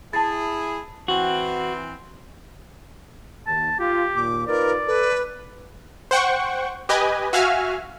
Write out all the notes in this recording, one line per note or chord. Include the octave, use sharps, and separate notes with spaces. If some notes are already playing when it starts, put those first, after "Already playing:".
E4 G#4 A5 A6
E3 C4 F#4
D#2 A5
F4 G4
D#2 A#2 D6
D#4 F4 A#4 B4 D5
A4 B4
C5 F#5 G5 C#6
G4 B4 D#5 G#5
F#4 E5 F5 G#5 F6